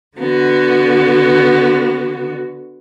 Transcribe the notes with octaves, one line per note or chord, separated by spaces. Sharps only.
D3 B3 F#4